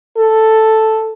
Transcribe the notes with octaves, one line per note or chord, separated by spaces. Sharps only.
A4